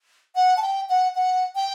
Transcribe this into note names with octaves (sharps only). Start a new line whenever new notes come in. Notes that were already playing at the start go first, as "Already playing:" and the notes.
F#5
A5
G5
F#5
F#5
G5